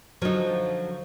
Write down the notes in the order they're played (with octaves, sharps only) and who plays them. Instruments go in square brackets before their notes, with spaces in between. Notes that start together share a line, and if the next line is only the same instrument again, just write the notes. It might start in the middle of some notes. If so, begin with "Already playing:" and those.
[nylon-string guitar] D3 F#3 [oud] F3 D#4